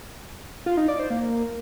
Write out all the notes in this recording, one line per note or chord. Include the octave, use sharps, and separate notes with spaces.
F4
D#4
D5
C5
A#3